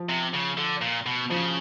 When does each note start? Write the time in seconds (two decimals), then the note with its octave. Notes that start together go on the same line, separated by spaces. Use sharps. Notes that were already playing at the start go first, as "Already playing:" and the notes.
Already playing: F3
0.09 C3
0.34 C#3
0.57 D3
0.81 A#2
1.06 B2
1.30 C#3 F3